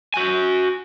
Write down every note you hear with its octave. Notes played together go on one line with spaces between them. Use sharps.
F#4 G#5